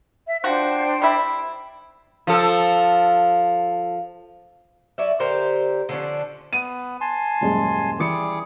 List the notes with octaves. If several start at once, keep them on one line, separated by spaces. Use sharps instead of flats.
E5
F3 D4 F#4 C5 G5
G3 E4
F3 A4
F#3 D5 E5
D3 G4 A#4 C5
D3 F3 C#4 D4
B3 D#7
G#5 A5 C6
D#1 F#2 G#3
E3 G3 G#4 D6 C#7